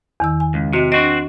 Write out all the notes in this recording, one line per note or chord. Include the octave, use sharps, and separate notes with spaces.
E2 D#3 E6
G#5
C#2
C3 F#4 D#5
C4 D4 F#4 D#5